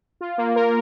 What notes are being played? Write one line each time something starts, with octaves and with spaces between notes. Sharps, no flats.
F4
A#3
A#4